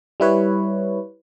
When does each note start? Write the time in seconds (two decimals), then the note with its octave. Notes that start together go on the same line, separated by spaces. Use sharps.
0.20 G3 E4 B4 C#5